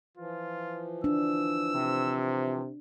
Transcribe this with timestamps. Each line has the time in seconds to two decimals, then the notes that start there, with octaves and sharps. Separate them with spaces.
0.17 E3 F3 F4
1.04 D4 E6
1.74 C3